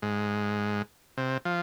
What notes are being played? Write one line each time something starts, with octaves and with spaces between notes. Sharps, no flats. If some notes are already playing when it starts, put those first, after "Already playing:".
G#2
C3
F3